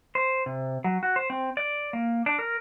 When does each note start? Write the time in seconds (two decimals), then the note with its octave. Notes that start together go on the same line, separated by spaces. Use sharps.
0.15 C5
0.46 C3
0.84 F#3
1.03 F#4
1.16 C5
1.30 C4
1.57 D5
1.93 A#3
2.26 D4
2.39 A#4